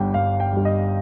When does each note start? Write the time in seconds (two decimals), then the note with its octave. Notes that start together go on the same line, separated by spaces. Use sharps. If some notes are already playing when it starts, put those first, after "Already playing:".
Already playing: G1 G2 G3 G5
0.14 G1 F5
0.40 G5
0.53 G2 G3
0.65 D#5